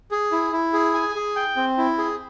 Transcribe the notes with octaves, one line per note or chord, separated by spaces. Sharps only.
G#4
E4
E4
G#4
G#5
G#4
G5
C4
E4
G#4